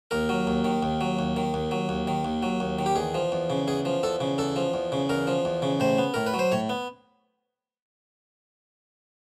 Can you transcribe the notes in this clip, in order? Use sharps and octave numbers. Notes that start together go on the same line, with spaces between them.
D#2 A#4
F#3
D#2
D#3
D#2
F#3
D#2
D#3
D#2
F#3
D#2
D#3
D#2
F#3
D#2
D#3
G4
E2 G#4
F3
E2
C#3
E2 G#4
F3
E2 A4
C#3
E2 A4
F3
E2
C#3
E2 A#4
F3
E2
C#3
A2 C5
B3
A2 A#4
B4
F#3
C5
A2 C#5
B3